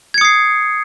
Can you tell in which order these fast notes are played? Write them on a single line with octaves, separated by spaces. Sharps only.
G#6 C#7 D#6 C7